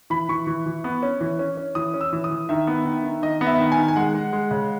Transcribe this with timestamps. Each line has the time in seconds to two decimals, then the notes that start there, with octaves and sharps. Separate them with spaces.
0.10 E3 B5
0.29 E3 C#6
0.47 E3
0.66 E3
0.84 B3
1.03 C#4
1.21 E3
1.39 C#4
1.57 C#4
1.75 E3 D#6
1.94 C#4
2.01 E6
2.13 E3
2.24 D#6
2.31 E3
2.49 D#3 E5
2.67 B3
2.85 D#3
3.04 D#3
3.22 D#3 D#5
3.41 B3
3.47 E5
3.60 D#3
3.72 G#5
3.78 D#3
3.88 G#5
3.96 G#3 F#5
4.15 G#3
4.33 G#3
4.51 C#3